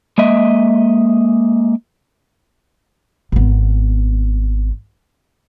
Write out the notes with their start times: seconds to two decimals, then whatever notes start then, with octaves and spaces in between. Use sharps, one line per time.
0.18 G#3 A#3 D#5 E5
3.32 G#1 B3